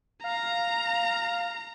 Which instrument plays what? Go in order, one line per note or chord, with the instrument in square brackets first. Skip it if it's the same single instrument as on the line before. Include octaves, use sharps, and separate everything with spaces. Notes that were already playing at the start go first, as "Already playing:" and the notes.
[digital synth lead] F5 [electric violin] A#5